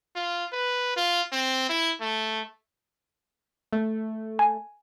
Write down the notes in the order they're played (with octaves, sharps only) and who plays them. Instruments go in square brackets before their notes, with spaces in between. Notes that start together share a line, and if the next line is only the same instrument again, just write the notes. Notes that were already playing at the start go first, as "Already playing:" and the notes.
[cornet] F4
B4
F4
C4
E4
A3
[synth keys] A3
[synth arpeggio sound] G#5